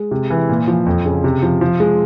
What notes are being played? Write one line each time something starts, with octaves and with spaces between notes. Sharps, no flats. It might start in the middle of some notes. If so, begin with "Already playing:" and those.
Already playing: G#3
C3
E3
A#2
F3
F2
C#3
C3
F3
F3
G#3